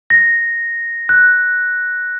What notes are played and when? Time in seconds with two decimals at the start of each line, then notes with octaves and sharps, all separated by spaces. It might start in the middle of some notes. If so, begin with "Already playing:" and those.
0.10 A#6
1.09 F#6